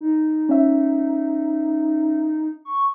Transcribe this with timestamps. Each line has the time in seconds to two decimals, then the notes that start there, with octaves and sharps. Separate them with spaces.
0.01 D#4
0.49 C#4 E5
2.65 C#6